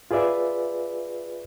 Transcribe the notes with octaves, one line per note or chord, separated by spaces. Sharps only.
F4 G#4 B4 D5 E5